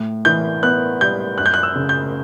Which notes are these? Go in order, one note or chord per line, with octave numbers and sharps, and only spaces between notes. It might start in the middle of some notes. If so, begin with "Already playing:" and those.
Already playing: A2
E3 G6
B3 F#6
G3 G6
F#2 F#6
G6
F#6
E6
C#3
G6